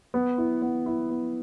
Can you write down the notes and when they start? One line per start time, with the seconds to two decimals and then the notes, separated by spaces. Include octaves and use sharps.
0.14 B3
0.38 E4
0.62 B3
0.86 E4
1.10 B3